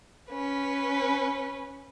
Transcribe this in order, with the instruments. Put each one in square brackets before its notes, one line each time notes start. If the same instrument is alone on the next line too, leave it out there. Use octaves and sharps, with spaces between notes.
[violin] C#4 B4